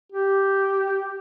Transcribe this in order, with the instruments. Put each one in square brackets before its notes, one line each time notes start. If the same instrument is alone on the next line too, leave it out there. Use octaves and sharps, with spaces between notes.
[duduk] G4